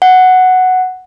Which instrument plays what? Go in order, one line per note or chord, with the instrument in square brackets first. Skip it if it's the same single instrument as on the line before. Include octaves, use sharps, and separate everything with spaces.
[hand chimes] F#5